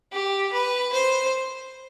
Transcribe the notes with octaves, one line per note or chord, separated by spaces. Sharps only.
G4
B4
C5